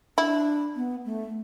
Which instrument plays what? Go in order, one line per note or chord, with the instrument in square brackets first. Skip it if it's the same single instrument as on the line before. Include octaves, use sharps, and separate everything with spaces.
[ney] D4 [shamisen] E4
[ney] B3
A3